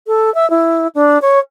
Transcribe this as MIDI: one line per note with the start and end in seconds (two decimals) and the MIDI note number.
0.07 0.33 69
0.35 0.48 76
0.50 0.87 64
0.95 1.18 62
1.22 1.39 73